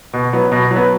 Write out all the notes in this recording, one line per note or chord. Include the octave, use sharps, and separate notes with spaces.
B2
F#3 B3
B2
F#3
B3